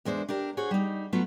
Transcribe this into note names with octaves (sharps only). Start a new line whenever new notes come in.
E2 G#3 D4 C5
D4 G4 A#4
F#4 G#4 C5 C#5
G3 D#4
F#3 A3 B3 F4